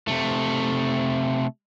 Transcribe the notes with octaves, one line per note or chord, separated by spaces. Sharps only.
C3 A3